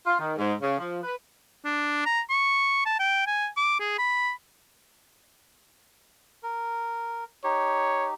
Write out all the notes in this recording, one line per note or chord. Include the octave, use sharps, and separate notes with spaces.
F4
D#3
G#2
C#3
F3
B4
D4
A#5
C#6
A5
G5
G#5
D6
G#4
B5
A#4
D#4 G4 C#5